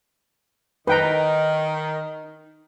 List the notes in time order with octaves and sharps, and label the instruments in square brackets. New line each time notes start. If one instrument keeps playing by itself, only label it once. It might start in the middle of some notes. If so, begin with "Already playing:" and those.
[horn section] D#3 [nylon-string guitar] D#4 D#5 [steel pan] B4 G5 A#5